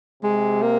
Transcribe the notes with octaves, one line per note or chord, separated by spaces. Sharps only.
C3 G#3
A#3